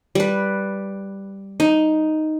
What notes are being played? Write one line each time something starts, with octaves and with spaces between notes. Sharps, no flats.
G3 B4
D#4